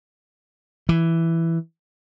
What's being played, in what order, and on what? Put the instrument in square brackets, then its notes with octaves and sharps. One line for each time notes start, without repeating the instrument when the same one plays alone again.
[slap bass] E3